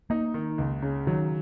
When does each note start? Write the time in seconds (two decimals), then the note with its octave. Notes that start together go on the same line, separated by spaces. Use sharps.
0.10 A#3 D#4
0.34 D#3
0.58 C#2
0.82 C#3
1.07 D#3 F#3